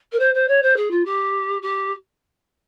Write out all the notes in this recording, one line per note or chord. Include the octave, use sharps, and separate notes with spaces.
A#4
C5
C5
C#5
C5
G#4
F4
G4
G4